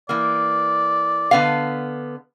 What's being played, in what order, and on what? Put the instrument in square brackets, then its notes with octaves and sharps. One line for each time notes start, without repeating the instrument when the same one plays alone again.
[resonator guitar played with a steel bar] E3 A#3 [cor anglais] D5
[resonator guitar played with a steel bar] D3 B3 F5